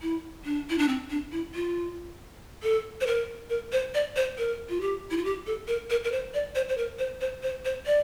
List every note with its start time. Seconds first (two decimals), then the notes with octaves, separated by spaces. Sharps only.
0.02 E4
0.45 D4
0.70 E4
0.78 D4
0.88 C4
1.10 D4
1.32 E4
1.55 F4
2.63 A4
3.01 C5
3.07 A#4
3.50 A#4
3.72 C5
3.94 D5
4.16 C5
4.38 A#4
4.69 F4
4.81 G4
5.11 E4
5.17 F4
5.25 G4
5.47 A4
5.68 A#4
5.90 A#4
6.04 A#4
6.12 C5
6.34 D5
6.55 C5
6.69 C5
6.78 A#4
6.99 C5
7.21 C5
7.43 C5
7.65 C5
7.86 D5